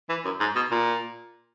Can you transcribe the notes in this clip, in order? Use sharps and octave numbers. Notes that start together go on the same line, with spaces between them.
E3
F#2
G#2
B2
A#2